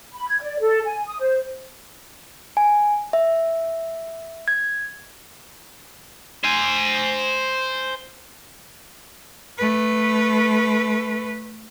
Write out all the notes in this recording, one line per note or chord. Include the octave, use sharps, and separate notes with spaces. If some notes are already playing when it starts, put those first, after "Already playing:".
B5
G#6
D5
A4
G#5
D#6
C5
G#5
E5
G#6
C5 G#5
A3 B4